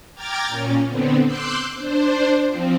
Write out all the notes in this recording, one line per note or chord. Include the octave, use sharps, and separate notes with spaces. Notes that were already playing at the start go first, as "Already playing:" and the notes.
G5 A#5 D6 F6 G#6 A6
A#2 C#4
D3 B3 C4
C6 D6 E6 F#6 G6
D4 C5
F3 C4